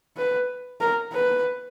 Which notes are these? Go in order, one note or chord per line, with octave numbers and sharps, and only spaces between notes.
B4
A#4
B4